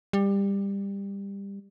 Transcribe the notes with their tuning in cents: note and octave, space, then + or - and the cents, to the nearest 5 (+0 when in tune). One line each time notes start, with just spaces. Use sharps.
G3 +20